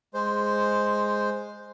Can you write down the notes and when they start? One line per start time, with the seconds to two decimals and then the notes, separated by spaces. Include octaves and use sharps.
0.14 G#3 C5